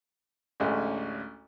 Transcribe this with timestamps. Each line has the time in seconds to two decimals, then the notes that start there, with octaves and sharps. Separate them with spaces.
0.60 A1 D2 G#3 C#4